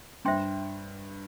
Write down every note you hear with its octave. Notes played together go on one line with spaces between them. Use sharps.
G2 C5 E5 G5 C6